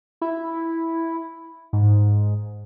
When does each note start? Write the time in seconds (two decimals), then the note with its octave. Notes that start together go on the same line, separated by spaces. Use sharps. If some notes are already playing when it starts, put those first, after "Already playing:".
0.22 E4
1.73 G#2